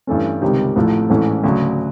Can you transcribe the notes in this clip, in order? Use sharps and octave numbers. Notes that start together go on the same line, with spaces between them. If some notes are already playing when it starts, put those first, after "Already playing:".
G2 E3 A3 C#4
C#2 C3 D#3 G3
A1 A2 F3 A3
A1 G#2 E3 A3 C#4
D2 C#3 F#3